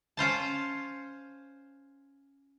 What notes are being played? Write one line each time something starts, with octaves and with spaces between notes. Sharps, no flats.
C#4 F4 C5 A5